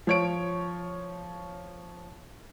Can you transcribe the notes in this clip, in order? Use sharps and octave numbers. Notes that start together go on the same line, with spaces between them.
F3 C#5 D7